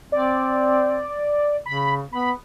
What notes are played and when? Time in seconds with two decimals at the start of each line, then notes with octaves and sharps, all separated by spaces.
0.12 C4 D5
1.66 C#3 B5
2.12 B3 B5